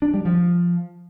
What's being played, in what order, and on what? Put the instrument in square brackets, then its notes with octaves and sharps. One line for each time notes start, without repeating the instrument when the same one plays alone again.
[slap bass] D4
G3
F3